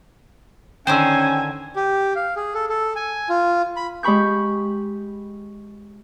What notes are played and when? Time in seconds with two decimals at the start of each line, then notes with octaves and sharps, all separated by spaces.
0.87 D3 D#3 C#4 C5 G5 G#5 E6
1.76 G4
2.16 F5
2.36 G#4
2.54 A4
2.69 A4
2.96 G#5
3.29 F4
3.76 B5
4.03 G#3 G4 B5 C#6 G6